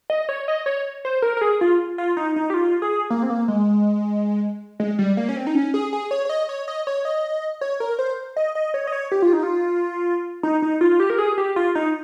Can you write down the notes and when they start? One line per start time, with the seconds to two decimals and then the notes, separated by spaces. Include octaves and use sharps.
0.10 D#5
0.29 C#5
0.48 D#5
0.66 C#5
1.05 C5
1.22 A#4
1.37 A#4
1.41 G#4
1.61 F4
1.98 F4
2.17 D#4
2.36 D#4
2.50 G4
2.54 F4
2.82 G#4
3.10 A#3
3.23 C4
3.30 A#3
3.48 G#3
4.80 G#3
4.99 G3
5.17 A#3
5.29 C#4
5.36 C4
5.47 D#4
5.55 C#4
5.74 G#4
5.93 G#4
6.11 C#5
6.25 C#5
6.29 D#5
6.49 C#5
6.68 D#5
6.87 C#5
7.05 D#5
7.61 C#5
7.80 A#4
7.99 C5
8.37 D#5
8.55 D#5
8.74 C#5
8.87 D#5
8.92 C#5
9.12 G4
9.22 F4
9.33 D#4
9.43 F4
10.43 D#4
10.62 D#4
10.81 F4
10.91 F4
11.00 G4
11.10 A#4
11.19 G#4
11.38 G4
11.56 F4
11.75 D#4